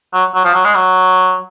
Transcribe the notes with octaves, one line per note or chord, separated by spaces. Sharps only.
F#3
F#3
F3
F#3
G#3
F#3